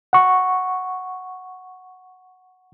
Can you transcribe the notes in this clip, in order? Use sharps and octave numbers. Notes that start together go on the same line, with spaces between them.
F#5 C#6